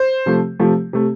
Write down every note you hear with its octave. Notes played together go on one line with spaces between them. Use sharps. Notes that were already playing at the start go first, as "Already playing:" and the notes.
Already playing: C5
C3 F3 A3
C3 F3 A3
C3 A3